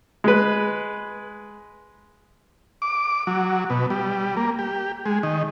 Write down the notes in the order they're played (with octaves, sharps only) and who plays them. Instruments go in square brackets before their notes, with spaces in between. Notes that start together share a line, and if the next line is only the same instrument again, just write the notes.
[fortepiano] G#3 B4
[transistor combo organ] D6
F#3
B2
G3
A#3
G4
G#3
D#3